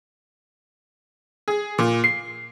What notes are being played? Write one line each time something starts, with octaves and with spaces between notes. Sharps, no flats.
G#4
A#2
C7